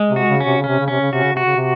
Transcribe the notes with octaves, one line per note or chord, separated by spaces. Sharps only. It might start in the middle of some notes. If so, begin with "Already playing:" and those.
Already playing: G#3
C3
F#4
C#3
C#4
C3
C#3
C3 C#4
C#3
C3 C#4
C#3
C3 F#4
C#3
C3 F#4
C#3
C3